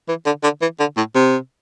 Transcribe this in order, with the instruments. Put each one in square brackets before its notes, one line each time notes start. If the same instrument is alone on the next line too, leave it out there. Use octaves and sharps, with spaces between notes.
[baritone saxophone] E3
D3
D3
E3
D3
A2
C3